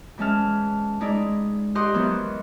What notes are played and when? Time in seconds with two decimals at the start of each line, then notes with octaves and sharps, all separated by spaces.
0.18 E3 G#3 C#4 A5 F6
1.00 G#3 D#4 E4 D5
1.75 G4 C5 D#5 F#5 C6 D#6
1.94 D#3 E3 F#3 B3